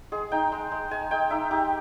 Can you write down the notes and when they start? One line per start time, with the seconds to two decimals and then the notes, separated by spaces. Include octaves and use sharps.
0.12 G#3 G#4
0.32 D#4 G5
0.52 G#3
0.72 G#3
0.91 G#3 G#5
1.11 G#3 G5
1.30 D#4 E5
1.51 D#4 G4